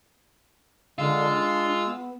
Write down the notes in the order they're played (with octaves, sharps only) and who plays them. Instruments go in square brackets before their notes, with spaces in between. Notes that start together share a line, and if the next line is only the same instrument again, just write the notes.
[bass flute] D3 [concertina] G#3 E6 [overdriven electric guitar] F4
[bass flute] D4
B3